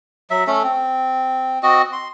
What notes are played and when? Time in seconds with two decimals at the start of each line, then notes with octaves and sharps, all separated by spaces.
0.30 F#3 E5
0.47 A3 C#4 A4
0.64 C4
1.63 C4 F#4 D#5
1.92 C6